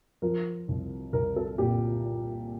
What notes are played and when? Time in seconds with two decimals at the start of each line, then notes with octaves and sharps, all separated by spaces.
0.22 F3 A#4
0.68 C2
1.13 C2 A#4
1.36 A4
1.58 A#2 G4